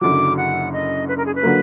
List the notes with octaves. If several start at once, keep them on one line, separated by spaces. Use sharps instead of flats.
F#1 F#2 D3 F#3 D6
F#5
D#5
B4
A#4
G#4
B4
D3 F#3 A#3